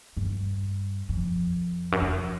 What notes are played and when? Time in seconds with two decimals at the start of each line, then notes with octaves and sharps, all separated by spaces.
0.17 G2
1.09 F2
1.92 F#2
2.02 F2